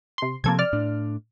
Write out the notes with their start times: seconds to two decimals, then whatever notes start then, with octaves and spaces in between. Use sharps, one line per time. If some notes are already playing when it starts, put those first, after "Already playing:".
0.18 C3 C6
0.44 C3 F3 A#3 C4 A4 G#6
0.59 D5 F6
0.73 A2 D4